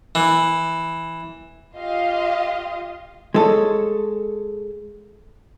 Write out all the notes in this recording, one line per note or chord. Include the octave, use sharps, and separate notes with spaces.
E3
F4 G4 D#5 F5 C6
G#3 A4 C#5